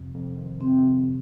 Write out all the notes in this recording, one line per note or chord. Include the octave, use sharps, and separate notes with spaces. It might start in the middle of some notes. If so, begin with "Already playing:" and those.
Already playing: F2 C3
F2
D#3
C3 C4
F2